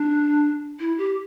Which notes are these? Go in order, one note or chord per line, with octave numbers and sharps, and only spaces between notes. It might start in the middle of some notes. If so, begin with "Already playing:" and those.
Already playing: D4
E4
G4